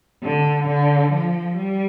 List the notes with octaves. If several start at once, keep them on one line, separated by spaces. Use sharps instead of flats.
D3
D3
F3
G3